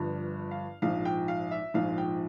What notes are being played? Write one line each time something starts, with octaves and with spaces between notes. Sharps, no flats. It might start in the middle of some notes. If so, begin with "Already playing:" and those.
Already playing: G1 G2 F3
F5
A#1 G#2 F3 F5
G5
F5
E5
A#1 G#2 F3 F5
G5